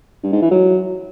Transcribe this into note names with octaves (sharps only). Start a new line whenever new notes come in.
G2
G#2
E3
F#3